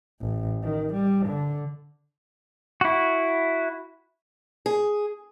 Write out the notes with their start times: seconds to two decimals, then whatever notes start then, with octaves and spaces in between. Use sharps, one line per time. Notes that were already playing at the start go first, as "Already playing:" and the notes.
0.21 A1
0.63 D#3
0.94 G3
1.27 D3
2.81 E4 F#4
4.66 G#4